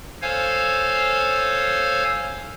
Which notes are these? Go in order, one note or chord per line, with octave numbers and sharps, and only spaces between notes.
A4 C5 C#5 F5 G#5